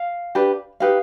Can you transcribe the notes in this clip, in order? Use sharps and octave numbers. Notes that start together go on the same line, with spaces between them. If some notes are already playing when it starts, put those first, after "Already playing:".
Already playing: F5
D4 G4 B4
D#4 G4 B4 F5